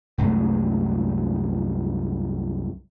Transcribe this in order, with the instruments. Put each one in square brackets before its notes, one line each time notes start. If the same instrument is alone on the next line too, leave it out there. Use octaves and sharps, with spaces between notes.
[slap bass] C2 F#2 G#3 A3